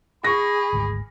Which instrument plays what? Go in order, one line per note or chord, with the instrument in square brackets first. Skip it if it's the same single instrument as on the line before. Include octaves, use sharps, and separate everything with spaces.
[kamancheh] G#4 [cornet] B5 [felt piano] C#6 A#6
[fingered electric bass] G#1 D2 G#2